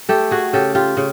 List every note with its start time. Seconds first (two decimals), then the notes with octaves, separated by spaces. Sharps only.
0.09 A3 G4 A4
0.31 F#4 G#4
0.53 C#3 G4 A4
0.75 F4 G4
0.97 C#3